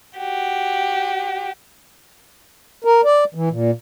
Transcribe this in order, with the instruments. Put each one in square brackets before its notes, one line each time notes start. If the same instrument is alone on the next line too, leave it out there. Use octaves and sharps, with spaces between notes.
[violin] F#4 G4
[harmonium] A#4
D5
E3
A#2